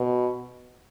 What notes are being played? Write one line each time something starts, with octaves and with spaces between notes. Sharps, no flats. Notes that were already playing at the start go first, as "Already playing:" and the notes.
Already playing: B2